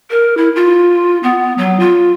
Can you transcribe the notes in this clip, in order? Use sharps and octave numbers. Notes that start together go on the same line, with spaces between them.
A#4
E4
F4
B3
F#3
F4